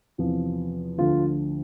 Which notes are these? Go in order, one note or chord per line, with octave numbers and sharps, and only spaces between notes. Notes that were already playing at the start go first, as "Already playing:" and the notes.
E2 C3 F3
D2 D3 F3 F4